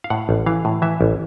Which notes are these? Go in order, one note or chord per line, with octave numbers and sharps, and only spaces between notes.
F5
A2 F#5
A1
E3 F5
A2
E3 E5
A1